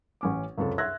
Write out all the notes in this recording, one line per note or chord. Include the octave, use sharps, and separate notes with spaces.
A1 C#4 D6
C#2 F#2 C3 A4
E5 C6 E6 F#6 G#6 A#6